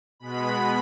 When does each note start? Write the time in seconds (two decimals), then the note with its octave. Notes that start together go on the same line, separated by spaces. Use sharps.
0.20 B2 G#3 B3 B5